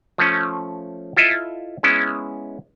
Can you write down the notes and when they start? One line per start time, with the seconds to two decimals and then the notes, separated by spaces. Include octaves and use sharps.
0.18 F3 A3 C#4
1.17 E4 F4 A4 D#5 E5
1.83 G#3 B3 C#4 E4